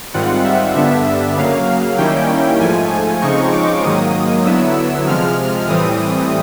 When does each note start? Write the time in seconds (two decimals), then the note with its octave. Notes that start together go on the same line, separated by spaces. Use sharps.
0.14 G#2 D#3 G3 C4 F4 F#5
0.44 E5
0.75 G2 D3 G3 B3 D4 E5
1.37 C#3 F#3 A#3 F5
1.98 D#3 G3 A#3 C#4 E4 G5
2.60 G#2 F3 A3 G#5
3.22 C#3 F3 G#3 C4 D#4 C#6
3.52 D6
3.83 G#2 D#3 F#3 A#3 D#6
4.45 D3 F#3 B3 E4 E6
5.06 C3 F3 G#3 F6
5.68 A2 E3 G3 C4 D#6